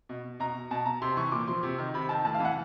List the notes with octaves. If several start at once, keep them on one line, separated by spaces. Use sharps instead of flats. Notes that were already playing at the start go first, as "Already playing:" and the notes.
B2
B2 A#5
B2 A5
A#5
C3 C6
E3 C#6
A#2 D6
F3 C6
C3
D#3
C3 B5
D#3 A5
A2 A5
F5
E3
F#5